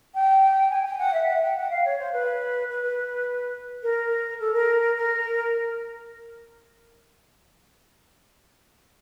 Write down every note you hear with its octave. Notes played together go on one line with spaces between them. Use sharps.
G5
G#5
G5
F#5
E5
F#5
G5
F#5
F5
C#5
C5
B4
B4
A#4
A4
A#4
A#4